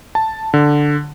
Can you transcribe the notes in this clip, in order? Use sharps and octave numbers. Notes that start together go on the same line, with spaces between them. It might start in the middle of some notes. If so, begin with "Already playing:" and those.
A5
D3